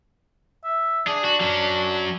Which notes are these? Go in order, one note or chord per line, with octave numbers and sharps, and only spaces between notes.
E5
D4 G#4
F#4
F#3 C#4